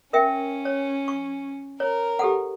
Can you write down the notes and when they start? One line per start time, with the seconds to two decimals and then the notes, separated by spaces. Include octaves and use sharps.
0.13 C#4 A#4 E5 G5
0.65 C#5
1.08 C#6
1.80 A#4 C#5
2.19 G4 A4 F#5